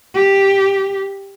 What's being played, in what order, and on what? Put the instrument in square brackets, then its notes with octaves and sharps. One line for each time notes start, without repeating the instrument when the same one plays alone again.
[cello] G4